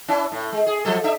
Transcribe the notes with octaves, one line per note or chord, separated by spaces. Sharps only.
C#4 E4
A2
G#3
G#4
F3 F#3 A4
D4 E5